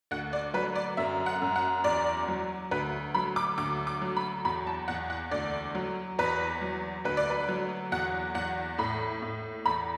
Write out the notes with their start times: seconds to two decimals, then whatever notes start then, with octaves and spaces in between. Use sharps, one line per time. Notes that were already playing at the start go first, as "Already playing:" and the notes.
0.11 D2 F#5
0.33 D5
0.54 F#3 B4
0.76 D5
0.97 F#2 E5
1.26 F#5
1.42 F#2
1.56 F#5
1.84 E2 D5
2.28 F#3
2.71 D2 B4
3.15 F#3 B5
3.36 D6
3.58 D2 D6
3.87 D6
4.02 F#3
4.17 B5
4.45 E2 B5
4.67 A5
4.88 E2 F#5
5.10 F#5
5.31 D2 D5
5.75 F#3
6.19 E2 B4
6.61 F#3
7.05 D2 B4
7.17 D5
7.30 B4
7.49 F#3
7.92 E2 F#5
8.35 E2 F#5
8.78 A2 B5
9.22 A2
9.66 E2 B5